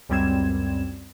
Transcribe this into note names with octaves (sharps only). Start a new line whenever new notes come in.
C#2 F#2 G3 C4 G#6 E7